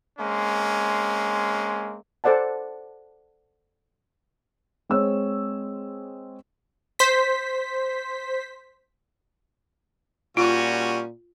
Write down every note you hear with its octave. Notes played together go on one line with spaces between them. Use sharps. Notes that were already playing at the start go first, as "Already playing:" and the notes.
G#3 A#3 C4 C#4
A4 C5 D5 F#5 A5
G#3 C4 C#5 E6
C5 B6
A#2 G3 C#4 F4 F#4